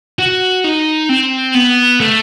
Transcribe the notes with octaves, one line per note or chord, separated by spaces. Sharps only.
F#4
D#4
C4
B3
A3